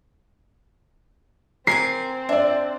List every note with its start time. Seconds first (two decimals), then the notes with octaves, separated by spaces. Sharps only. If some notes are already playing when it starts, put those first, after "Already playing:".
1.67 C4 A#4 G#5 D6 C7
2.29 D4 D5 E5